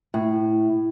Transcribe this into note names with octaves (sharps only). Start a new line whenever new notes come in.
A2